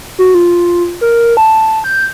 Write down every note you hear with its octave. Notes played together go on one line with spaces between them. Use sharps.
F#4
F4
A#4
A5
G6